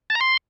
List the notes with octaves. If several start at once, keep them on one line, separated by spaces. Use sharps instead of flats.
A5
A#5
C6